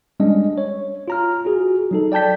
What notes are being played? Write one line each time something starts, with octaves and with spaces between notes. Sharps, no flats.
G3 G#3 C#4 D4 D#5
C#5
F4 A#5 F6
F4 F#4 G#4
F#3 D#4 A4
D5 G5 A5 G6 B6